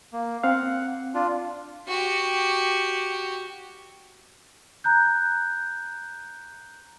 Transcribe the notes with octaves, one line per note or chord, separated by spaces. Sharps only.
A#3
C4 F5 F#5
D4 F4
F#4 G4
A#5 F#6 G6